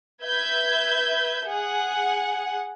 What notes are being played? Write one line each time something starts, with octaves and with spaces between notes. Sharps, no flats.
B4 E5 G6 G#6
G#4 F#5